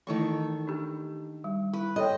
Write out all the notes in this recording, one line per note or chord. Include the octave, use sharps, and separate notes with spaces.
D#3 E3 A3 E4 A4 C#6
D4 G4
G3
E4 B4
A4 C5 C#5 D#5 G5